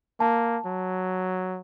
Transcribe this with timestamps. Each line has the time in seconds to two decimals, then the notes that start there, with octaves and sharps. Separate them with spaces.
0.20 A#3 A5
0.66 F#3